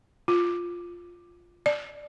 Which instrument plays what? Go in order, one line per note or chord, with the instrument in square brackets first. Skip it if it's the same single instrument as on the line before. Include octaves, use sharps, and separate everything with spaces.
[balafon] F4
D5